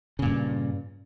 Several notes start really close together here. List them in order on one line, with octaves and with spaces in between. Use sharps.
C#3 A#2 G2